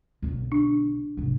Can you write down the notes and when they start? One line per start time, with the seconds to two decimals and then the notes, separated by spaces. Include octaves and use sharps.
0.22 B1 D3
0.52 D4
1.17 G#2 C3